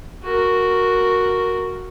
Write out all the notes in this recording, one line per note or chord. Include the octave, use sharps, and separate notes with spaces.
F#4 A#4